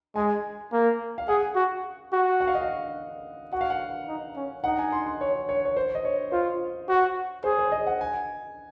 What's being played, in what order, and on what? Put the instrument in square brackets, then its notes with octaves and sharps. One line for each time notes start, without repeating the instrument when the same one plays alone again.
[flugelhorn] G#3 [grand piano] G#5
[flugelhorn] A#3
[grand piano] F5
[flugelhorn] G#4 [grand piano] F#5
[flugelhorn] F#4
F#4
[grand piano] F#5
F5
D#5
F5
[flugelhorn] F#4 [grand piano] F#5
[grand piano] F5
F#5
[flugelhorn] D#4
C#4
[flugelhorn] D#4 [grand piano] F#5
[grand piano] G#5
C6
C6
C#5
C#5
C#5
C5
D#5
C#5
[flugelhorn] F4 [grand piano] C5
[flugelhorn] F#4
[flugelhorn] G#4 [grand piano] C5
[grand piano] C5
D#5
F#5
G#5